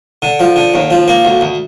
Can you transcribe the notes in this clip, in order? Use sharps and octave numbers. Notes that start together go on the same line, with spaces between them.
D3
F3
D3
D#2
F3
A#3
D2
D2